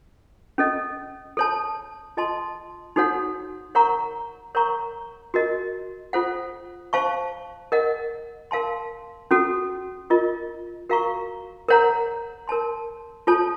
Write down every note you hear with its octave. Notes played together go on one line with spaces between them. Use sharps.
C#4 A4 D#5
A4 C#5 A5
F4 A4 D#5 A5 C6
D#4 F#4 A4 C#5 F#5
A#4 C#5 F#5 A#5 C#6
A#4 C#5 F#5 A#5 C#6
F#4 A#4 D#5
F4 A4 C5 F#5
C5 F5 A5 C#6
A#4 D#5 F#5
A#4 F5 A5 C6
C#4 F#4 A4
F4 A#4 D#5
F#4 A#4 F5 A#5 C#6
A#4 C#5 F#5 A#5
A#4 C#5 A5 C6
F4 A4 C#5 A5